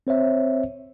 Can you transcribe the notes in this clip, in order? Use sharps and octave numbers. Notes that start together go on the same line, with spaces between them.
C4 C5 C#5 E5